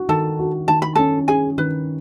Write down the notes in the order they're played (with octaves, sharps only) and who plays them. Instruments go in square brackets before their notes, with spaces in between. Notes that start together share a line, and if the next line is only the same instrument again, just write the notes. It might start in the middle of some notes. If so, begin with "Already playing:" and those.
Already playing: [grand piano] F#4
[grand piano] D#3 [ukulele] A4 A5
[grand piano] F#4
[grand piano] D#3 [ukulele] A5
[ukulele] B5
[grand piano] C#4 [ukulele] A4 A5
[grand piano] C#4 [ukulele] G#4 G#5
[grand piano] D#3 [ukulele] B4